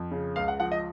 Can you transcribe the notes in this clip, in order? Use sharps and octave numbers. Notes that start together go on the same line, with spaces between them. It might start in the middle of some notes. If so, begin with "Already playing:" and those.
Already playing: F2
C#3
C#2 F5
F#5
F3 F#5
D#5